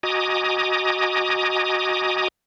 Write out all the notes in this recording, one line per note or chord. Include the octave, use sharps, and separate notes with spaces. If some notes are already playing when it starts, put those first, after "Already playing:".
F#4 D#5 G#5 A#5 D6 D#6